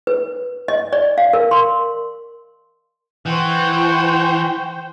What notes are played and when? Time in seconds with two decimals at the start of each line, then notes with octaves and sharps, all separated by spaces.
0.07 B4
0.68 D#5
0.93 D5
1.18 F5
1.33 A#4
1.51 C6
3.26 E3 C5 F#5 G5 C#6